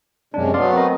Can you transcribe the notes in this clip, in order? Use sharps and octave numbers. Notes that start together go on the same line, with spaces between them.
F#2 C3 G#3 C#4 D4
F#3 A3 B3 D5 F5 C6
C4 A#4 D#5